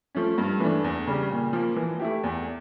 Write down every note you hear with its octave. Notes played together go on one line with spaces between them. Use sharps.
F3 A3 C#4
G2
E3 A3 D4
E2
C#3 G3
A#2
F3 A#3
E3
A3 E4 G4
E2